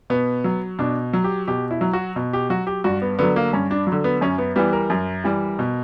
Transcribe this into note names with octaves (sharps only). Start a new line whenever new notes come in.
B2 B3
F#3
B2 D4
F#3
G4
B2 G4
E4
F#3
F#4
B2
G4
F#3 F#4
G4
G2 F#4
B3
D3 F#3 B3
A#3
G2 C#4
D4
F#3
D3
B3
F#2 C#4
B3
E3 G3 B3
A#4
F#2
E3 G3
B2